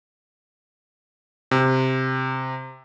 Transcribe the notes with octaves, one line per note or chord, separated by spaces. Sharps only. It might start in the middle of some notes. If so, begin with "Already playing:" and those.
C3